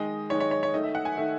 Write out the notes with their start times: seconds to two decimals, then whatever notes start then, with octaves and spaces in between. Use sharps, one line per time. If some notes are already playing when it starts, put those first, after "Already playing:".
Already playing: D#3 G#3 D#5
0.30 D#3 G#3 C#5
0.40 C#5
0.51 C#5
0.63 C#5
0.74 D#3 A3 D#5
0.84 E5
0.95 F#5
1.05 G#5
1.17 D#3 A3 E5